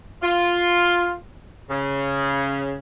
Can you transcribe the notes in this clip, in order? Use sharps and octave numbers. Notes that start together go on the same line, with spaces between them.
F4
C#3